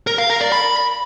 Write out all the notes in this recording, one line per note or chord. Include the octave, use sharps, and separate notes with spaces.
A#4
F5
A#4
D5
B5